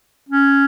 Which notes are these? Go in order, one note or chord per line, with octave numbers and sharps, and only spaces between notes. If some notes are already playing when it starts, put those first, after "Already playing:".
C#4